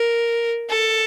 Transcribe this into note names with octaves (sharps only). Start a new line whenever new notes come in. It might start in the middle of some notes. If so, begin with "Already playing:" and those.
Already playing: A#4
A4